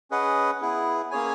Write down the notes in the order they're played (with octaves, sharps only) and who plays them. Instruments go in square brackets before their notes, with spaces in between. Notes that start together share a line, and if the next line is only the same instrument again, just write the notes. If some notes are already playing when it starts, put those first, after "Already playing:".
[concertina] C#4 G#4 B4 D#5 F#5
B3 E4 G#4
A#3 C#4 G#4 C#5 G#5